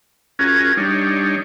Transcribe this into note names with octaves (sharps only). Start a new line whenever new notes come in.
C#4 F4 F#4 G#4 A#4
G3 D4 D#4 C#5